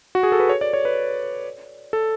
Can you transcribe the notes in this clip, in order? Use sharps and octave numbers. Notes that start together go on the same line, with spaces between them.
F#4
G#4
A4
B4
C#5
D5
C#5
B4
A4